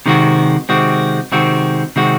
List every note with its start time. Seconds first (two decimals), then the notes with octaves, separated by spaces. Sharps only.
0.06 C3 D#3 G#3 C4 F#4
0.69 C3 D#3 G#3 C4 F#4
1.32 C3 D#3 G#3 C4 F#4
1.96 C3 D#3 G#3 C4 F#4